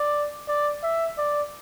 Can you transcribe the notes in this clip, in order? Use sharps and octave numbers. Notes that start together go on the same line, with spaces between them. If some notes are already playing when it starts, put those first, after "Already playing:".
Already playing: D5
D5
E5
D5